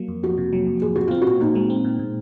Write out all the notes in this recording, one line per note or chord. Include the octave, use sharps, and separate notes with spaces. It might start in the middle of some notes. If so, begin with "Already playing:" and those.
Already playing: F#3 A#3
F2
F2 F#4
C3
F#3
F2
F2 G#4
C3 F#4
C4 F4
A#2 F#4
A#2 D#4
G#3
C4
A#2
A#2